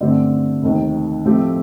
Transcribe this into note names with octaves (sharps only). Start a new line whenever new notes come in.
G2 D3 A3 C4 G4
F1 D#2 D#3
A2 F3 A3 C4 G4